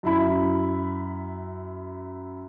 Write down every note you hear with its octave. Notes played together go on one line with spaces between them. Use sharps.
F#2 E4 B5